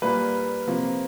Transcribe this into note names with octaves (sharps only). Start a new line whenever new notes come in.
A#2 G3 A#3 B4
C3 F3 A#3